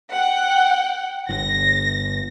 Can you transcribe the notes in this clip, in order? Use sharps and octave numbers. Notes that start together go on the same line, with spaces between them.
F#5 G5
G1 A#6